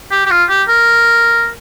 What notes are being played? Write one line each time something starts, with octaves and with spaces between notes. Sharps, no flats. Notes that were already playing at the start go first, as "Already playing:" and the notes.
G4
G4
F4
G4
A#4